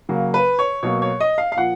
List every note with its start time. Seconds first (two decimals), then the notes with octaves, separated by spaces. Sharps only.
0.09 C#3 F#3 A#3
0.34 B4
0.59 C#5
0.83 B2 F#3 A#3 C#5
1.02 C#5
1.21 D#5
1.38 F5
1.52 F5
1.56 A#2 F3 F#5